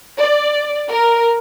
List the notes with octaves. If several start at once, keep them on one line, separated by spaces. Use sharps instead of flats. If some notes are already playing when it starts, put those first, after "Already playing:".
D5
A#4